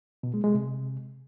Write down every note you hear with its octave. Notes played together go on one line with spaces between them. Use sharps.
B2
G#3
G#3
C3